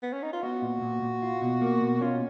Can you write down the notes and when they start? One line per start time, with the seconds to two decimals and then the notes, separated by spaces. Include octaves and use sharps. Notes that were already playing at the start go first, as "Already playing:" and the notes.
0.02 B3
0.13 C#4
0.22 D#4
0.33 F4
0.42 B3 F#4
0.62 A#2
0.82 A#2
1.02 A#2
1.23 F4
1.42 B2
1.61 A#3
1.82 B2
2.01 C#4 F4